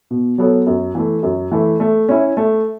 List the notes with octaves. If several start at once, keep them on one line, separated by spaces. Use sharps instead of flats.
B2
F#3 B3 A4 C#5
F#2
E3 A3
F#2
E3 A3
A3
C#4 E4
A3